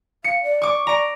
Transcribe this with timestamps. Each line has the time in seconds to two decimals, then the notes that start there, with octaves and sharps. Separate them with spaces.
0.24 F5 C#7
0.43 D5
0.62 C#6 D6
0.87 D5 A#5 D7